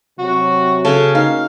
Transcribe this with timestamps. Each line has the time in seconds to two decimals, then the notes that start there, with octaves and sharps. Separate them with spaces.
0.19 C3 F#3 F#4
0.85 C#3 F#4 G#4 A4
1.15 A#3 D#4 F5